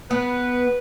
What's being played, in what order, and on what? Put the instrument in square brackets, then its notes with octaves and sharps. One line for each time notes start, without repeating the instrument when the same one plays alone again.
[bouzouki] B3 [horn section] B4